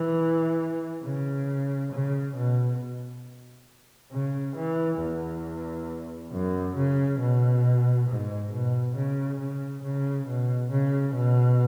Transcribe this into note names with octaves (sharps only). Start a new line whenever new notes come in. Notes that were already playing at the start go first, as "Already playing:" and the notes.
Already playing: E3
C#3
C#3
B2
C#3
E3
E2
F#2
C#3
B2
G#2
B2
C#3
C#3
C#3
B2
C#3
B2